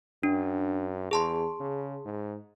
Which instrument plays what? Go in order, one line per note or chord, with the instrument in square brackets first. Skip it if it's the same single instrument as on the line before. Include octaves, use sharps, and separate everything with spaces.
[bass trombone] F#2 [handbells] D4
[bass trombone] E2 [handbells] G#4 A5 C6
[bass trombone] C#3
G#2